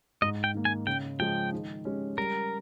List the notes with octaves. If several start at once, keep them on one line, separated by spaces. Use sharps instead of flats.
G#2 D#5
G5
D#3 A#3
G#5
C#3 G5
F3 G#3 G5
D#3
G#3 C#4 G4
G3 A#4